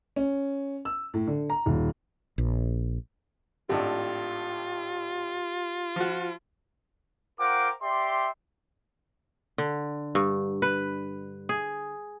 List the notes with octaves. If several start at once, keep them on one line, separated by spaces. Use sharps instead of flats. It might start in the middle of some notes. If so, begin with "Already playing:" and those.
C#4
E6
A2
D3
A#5
D#1
A#1
G#1 A2 D4 F4 G4
F3 F#4
F4 A#4 C5 F#5 G5 D6
G4 D5 E5 C6
D3
G2
B4
G#4